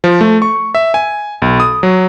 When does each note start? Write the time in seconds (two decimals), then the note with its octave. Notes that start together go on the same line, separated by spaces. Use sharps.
0.04 F3
0.21 A3
0.42 C#6
0.75 E5
0.94 G#5
1.42 B1
1.60 D#6
1.83 F#3